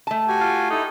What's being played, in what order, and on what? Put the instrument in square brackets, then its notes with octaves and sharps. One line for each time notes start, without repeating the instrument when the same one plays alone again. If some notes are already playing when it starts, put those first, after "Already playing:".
[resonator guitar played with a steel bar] A3 A5
[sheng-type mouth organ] F#4 G4 G#5
[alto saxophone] F4
[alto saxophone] D#4 [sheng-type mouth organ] E4 A4